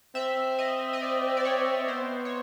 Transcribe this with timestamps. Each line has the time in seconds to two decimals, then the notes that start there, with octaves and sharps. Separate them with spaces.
0.15 C4 E5
0.59 D#5
0.93 D#5
1.02 D5
1.37 D5
1.45 C#5
1.88 B3 C5
2.25 C#5